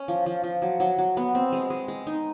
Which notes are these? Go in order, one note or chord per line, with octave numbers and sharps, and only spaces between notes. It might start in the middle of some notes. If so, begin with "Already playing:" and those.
Already playing: C#4
F3
F3
F3
F#3
F#3
F#3
B3
C4
G#3
G#3
G#3
D#4